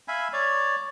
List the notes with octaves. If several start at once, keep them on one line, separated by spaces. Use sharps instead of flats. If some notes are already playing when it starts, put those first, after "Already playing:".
E5 F5 G#5 B5
C#5 D5